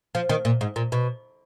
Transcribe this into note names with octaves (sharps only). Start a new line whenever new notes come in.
F3
D#3
A#2
G#2
A#2
B2